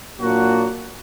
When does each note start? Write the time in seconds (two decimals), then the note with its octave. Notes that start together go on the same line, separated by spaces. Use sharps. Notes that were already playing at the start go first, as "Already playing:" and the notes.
0.19 A#2 F#3 A#3 D4 F#4